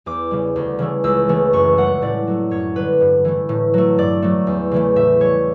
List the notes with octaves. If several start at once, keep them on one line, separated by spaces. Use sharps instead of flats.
E2 D6
C#3 G3
D2
C#3 E3 A3
C#2 E6
C#3 E3 A3
F#2 C#6
C#3 G3 F#5
A2 D5
F#3 A3
F#2 C#5
D3 G3 B4
G2
E3 A3
A2
F#3 A3
G2 D5
F#3 A3
E2
C#3 E3 A3
A2 E5
G3 C#5